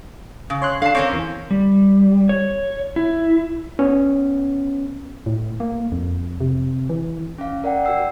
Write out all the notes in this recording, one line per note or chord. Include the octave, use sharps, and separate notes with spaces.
C#3
C#5 C6 F#6
D3 F5 A5 C7
C4 C#4 A#4 C#5 D6
E2
G3
C#5
E4
B3 C#4
A2
A#3
F2
C3
E3
C#4 F5
A#4 D5 F#5 G5
F#4 A#4 G5 E6 C7